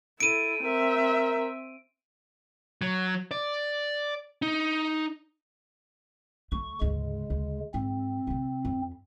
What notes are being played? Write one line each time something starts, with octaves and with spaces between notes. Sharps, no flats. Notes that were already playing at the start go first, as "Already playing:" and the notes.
E4 A4 D7 D#7
C4 A#4 E5
F#3
D5
D#4
D2 A3 C#6
D2 G#2 C#3 G#3
D2
G#2 C4
C3 A3
F2